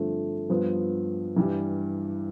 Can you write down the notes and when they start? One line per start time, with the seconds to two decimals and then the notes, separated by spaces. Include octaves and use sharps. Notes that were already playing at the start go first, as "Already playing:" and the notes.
Already playing: G2 D3 F3 A3 C4
0.50 G2 F3 B3
1.36 G2 E3 G3